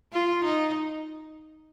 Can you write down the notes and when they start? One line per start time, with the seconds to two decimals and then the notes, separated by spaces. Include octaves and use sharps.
0.13 F4
0.45 D#4